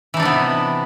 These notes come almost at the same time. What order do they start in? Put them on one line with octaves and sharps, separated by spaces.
E3 D#4 D4 C3 B3